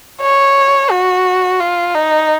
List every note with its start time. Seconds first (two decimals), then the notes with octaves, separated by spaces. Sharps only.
0.21 C#5
0.91 F#4
1.60 F4
1.95 D#4